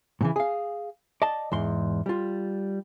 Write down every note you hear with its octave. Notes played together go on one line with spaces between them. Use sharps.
A2 C#3 E3
G#4 F5
D5 D#5 A5
E2 G#2 C6
G3 F4